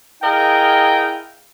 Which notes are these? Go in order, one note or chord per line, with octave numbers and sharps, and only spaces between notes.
E4 G#4 A#4 D#5 F5 G5